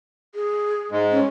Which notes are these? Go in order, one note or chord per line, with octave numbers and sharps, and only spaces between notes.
G#4
G#2 G#3
C#4